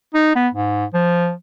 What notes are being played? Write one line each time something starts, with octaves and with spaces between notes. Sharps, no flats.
D#4
B3
G#2
F3